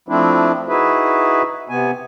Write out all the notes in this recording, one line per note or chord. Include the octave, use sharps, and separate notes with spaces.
F3 A3 C4 D4 E4
D#4 E4 F#4 G#4 B4 E5
C3 B3 G#5